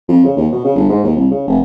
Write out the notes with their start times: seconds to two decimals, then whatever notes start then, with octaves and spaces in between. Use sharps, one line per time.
0.08 F2
0.25 C#3
0.37 D#2
0.52 B2
0.64 C#3
0.76 G1
0.90 G#2
1.04 D#2
1.16 C2
1.31 C#3
1.48 F1